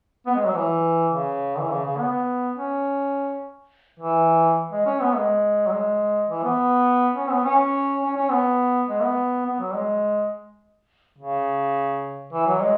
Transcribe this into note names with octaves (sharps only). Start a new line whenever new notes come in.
B3
G#3
F#3
E3
C#3
E3
C#3
C#3
B3
C#4
E3
G#3
C#4
B3
G#3
F#3
G#3
E3
B3
C#4
B3
C#4
C#4
C#4
B3
G#3
B3
B3
F#3
G#3
C#3
E3
F#3
G#3